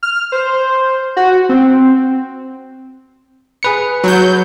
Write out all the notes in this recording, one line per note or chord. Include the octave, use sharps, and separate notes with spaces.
F6
C5
F#4
C4
G#4 B4 C#7
F#3 G6